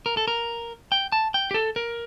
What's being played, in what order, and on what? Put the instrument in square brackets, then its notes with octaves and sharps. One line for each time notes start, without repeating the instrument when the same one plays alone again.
[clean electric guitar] A#4
A4
A#4
G5
A5
G5
G4
A4
A#4